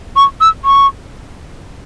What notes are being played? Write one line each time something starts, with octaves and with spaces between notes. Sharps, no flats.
C#6
E6
C#6